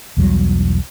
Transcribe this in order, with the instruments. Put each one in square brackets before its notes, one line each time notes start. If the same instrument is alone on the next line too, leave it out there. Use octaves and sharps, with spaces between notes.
[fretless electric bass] B1 E2 F#3 G3